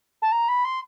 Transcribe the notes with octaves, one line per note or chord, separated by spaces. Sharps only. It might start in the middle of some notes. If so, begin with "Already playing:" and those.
A5
A#5
B5
C6